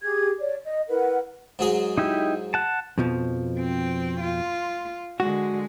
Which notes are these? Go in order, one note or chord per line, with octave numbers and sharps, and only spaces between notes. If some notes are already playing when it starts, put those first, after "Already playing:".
G4 G#4 G#6
C#5 D5
D#5
E4 A#4 B4 F#5
G#2 F#3 G#4
D#4 E4 G4
F#5 A5
F2 B2 F3
C4 G5
F4
D3 G#3 F#4